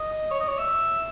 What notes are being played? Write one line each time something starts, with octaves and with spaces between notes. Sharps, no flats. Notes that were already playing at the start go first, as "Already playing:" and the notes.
Already playing: D#5
C#5
D#5
C#5
E5